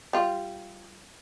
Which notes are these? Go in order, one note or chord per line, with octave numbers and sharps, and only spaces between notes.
G3 F4